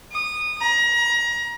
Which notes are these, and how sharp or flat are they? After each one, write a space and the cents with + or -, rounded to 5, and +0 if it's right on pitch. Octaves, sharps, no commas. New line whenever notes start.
D#6 -20
A#5 +30